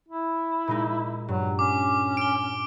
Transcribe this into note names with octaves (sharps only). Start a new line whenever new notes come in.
E4
A#2 G#3 D#4
G2 F#3
C#4 D6
D7 G7